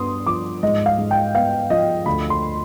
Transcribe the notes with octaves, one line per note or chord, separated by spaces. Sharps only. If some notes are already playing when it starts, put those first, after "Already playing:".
Already playing: G2 B3 D4 C6 D#6
F3 D6
G#2 D#5
F5
G#2
G5
B3 F5
F3 D#5
D2 B5
C6